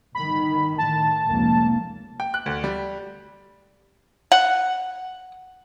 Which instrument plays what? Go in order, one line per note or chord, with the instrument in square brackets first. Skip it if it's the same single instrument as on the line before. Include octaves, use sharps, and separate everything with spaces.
[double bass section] G1 D#3 [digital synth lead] B5
[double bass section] A2 D#3 [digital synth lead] A5
[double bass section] F1 C#2 A#3
[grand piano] G5
F#6
D2
G3
[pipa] F#5